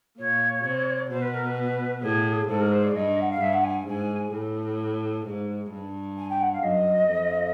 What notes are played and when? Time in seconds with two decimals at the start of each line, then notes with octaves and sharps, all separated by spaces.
0.18 A#2 C#5
0.64 C3
1.10 B2 C5
1.22 B4
1.34 A#4
1.46 B4
2.02 A2 G#4
2.49 G#2 A4
2.61 A#4
2.72 C5
2.84 D5
2.95 G2 D#5
3.21 F#5
3.30 F5
3.41 G2 E5
3.53 F#5
3.64 G#5
3.87 G#2 G#5
4.33 A2
5.26 G#2
5.72 G2
6.18 G#5
6.30 G5
6.41 F#5
6.53 F5
6.63 F#2 D#5
7.10 F2